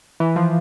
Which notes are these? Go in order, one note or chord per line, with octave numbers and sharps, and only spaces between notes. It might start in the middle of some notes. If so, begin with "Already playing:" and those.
E3
F3